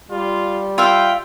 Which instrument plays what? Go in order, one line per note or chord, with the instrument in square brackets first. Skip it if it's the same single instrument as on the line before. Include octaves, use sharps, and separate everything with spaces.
[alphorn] G3 [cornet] F4
[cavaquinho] F4 E5 F5 [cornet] G5